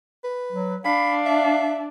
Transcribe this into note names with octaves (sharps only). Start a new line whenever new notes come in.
B4
F#3
D4 F5 B5
E5